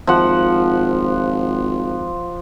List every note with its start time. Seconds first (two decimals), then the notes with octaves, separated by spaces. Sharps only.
0.07 G#1 F3 F#5